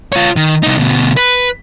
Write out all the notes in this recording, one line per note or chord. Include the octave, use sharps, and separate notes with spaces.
F4 C#5
D#3
C2 D#4
D2 B2
B4